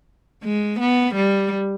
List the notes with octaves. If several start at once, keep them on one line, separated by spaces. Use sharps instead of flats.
G#3
B3
G3